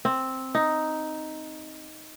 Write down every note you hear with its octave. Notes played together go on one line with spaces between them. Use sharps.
C4
D#4